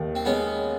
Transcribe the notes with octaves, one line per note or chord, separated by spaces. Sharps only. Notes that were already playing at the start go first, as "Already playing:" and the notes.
Already playing: D#2 D#3
C4
G#3 B3 C#4